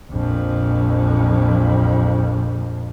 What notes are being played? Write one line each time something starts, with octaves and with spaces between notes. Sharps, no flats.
A#1 F2